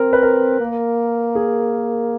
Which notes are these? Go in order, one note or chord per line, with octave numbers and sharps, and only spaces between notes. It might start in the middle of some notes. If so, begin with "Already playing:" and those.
Already playing: C4 A#4
B4
A#4
A#3
G#4